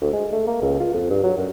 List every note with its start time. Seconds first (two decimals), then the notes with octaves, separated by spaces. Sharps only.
0.01 D2
0.13 G#3
0.32 A3
0.47 A#3
0.62 C#2
0.80 F4
0.93 F2
1.10 G2
1.23 F#3
1.37 F#2